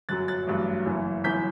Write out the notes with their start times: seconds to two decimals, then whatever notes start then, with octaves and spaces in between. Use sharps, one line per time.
0.09 G1 F#2 F#3 F#6 A6
0.28 F#6 A6
0.47 A1 G2 F#3
0.86 F#1 F#2 E3
1.24 G1 F#2 E3 G6 B6